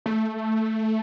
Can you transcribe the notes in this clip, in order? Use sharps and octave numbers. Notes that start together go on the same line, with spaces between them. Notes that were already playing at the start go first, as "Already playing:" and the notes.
A3